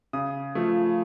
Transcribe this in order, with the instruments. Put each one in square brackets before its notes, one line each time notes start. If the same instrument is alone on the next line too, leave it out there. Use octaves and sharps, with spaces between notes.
[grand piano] C#3 D#6
F3 A3